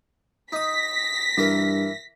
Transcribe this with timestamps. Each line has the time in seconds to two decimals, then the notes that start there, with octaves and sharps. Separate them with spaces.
0.52 D#4 D#6 A#6 B6
1.38 G2 E3 A#4